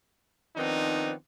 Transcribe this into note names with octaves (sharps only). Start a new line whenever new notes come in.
D#3 F3 B3 C4 D4 D#4